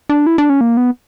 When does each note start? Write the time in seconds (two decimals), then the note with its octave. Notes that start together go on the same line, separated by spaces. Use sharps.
0.09 D4
0.27 E4
0.38 D4
0.50 C#4
0.61 A#3
0.77 B3